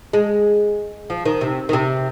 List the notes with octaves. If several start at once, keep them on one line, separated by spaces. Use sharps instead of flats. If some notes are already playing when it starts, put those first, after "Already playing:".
G#3
F3
D#3
C3
D#3
C3